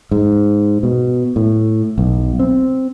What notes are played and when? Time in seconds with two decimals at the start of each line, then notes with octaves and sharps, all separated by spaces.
0.11 G#2
0.83 B2
1.36 A2
1.98 B1
2.39 C4